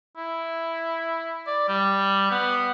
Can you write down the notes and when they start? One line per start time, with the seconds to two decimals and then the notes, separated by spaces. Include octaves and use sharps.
0.16 E4
1.47 D5
1.68 G3
2.31 B3